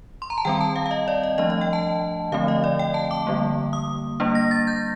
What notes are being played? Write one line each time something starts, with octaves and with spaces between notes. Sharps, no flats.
C6
A#5
A5
D#3 G3 C4 G5
A5
F5
F5
D#5
D5
D#5
F3 A3 D4 D#5
D#5
G5
A5
D3 F3 A3 C4 F5
D#5
D5
G5
A5
D6
D3 G3 A#3
D#6
G3 A#3 D4
A#6
A6
G6